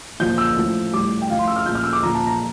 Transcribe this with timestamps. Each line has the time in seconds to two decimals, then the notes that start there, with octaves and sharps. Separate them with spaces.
0.20 A#2 F3 G6
0.38 E6
0.56 A2 F3
0.92 A2 G3 D6
1.21 G5
1.29 A2 F3 F5
1.39 C6
1.48 E6
1.56 F6
1.66 A#2 F3 G6
1.75 F6
1.84 E6
1.93 D6
2.03 A#2 F3 A#5
2.15 A5
2.27 A#5